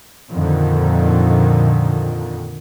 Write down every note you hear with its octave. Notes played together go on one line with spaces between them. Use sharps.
F2 A#2 D3 D#3